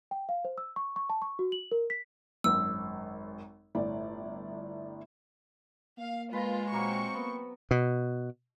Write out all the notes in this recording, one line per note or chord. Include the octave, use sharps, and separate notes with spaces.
G5
F5
C5
E6
C#6
C#6
A5
C#6
F#4
F#7
A#4
B6
G#1 F#2 E6
G1 A2 D5
A#3 F5
G#3 F4 B4 A#5
A#2 F#3 A#3 C4 F#4 C#6
A#3 B3
B2